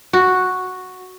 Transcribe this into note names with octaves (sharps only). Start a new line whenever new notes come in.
F#4